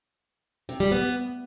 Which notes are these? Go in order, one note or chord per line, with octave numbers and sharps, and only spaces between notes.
C3
G3
B3